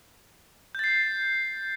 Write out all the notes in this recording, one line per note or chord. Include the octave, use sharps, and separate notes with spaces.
G6 A6 C7